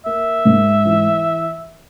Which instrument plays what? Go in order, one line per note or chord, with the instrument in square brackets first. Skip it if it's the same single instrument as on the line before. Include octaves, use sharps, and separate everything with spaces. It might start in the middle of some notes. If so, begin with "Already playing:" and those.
[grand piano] A#3 [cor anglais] E5
[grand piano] G#2
E3